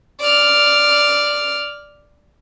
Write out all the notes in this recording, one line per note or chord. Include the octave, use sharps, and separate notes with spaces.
D5 F6